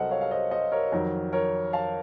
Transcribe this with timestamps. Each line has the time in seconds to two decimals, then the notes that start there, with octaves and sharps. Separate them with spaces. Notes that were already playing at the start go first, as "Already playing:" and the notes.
Already playing: C2 C3 F#3 A4 A#4 C5 D#5 F#5
0.11 C#5 F5
0.21 F5
0.31 C5 D#5
0.51 C5 D#5
0.72 A#4 C#5
0.92 F2 D#3 F#3 A#4
1.33 A#4 C#5
1.73 F5 A5